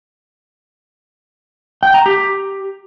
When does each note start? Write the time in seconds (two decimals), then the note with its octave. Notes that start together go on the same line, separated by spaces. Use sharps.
1.83 G5
1.94 A#5
2.06 G4